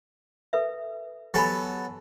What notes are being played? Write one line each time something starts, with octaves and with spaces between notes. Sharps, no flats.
A4 B4 E5
F#3 B3 G4 A4 G#5 B5